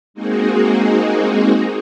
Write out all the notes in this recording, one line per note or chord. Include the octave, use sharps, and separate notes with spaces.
G#3 A#3 C4 D#4 F#4 G#4